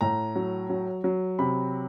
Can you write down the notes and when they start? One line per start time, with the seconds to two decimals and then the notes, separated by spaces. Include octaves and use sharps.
0.01 A2 A#5
0.36 F#3
0.70 F#3
1.04 F#3
1.39 C3 B5